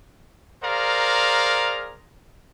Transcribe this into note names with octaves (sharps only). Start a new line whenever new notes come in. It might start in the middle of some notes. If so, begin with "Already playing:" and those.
G#4 A#4 C5 D5 F5 A#5